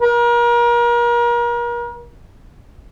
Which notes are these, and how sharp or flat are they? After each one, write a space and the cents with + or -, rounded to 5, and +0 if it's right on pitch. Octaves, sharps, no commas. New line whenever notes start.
A#4 +35